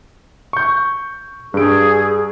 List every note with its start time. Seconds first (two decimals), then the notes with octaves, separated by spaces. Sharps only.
0.53 C#6 G6
1.54 G2 G#4 D7